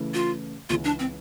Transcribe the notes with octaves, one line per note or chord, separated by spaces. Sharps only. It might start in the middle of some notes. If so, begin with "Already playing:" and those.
Already playing: C#3 E3 A3
F4
C#2 C#3 E3 F4
D4
C4